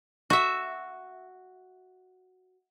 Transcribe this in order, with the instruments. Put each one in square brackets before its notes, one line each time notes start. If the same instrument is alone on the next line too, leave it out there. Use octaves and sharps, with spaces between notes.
[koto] F#4 E5